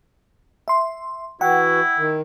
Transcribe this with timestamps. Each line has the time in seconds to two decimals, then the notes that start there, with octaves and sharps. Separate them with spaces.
0.68 E5 C6
1.41 E3 E4 F#4 F#5 G5
1.98 D#3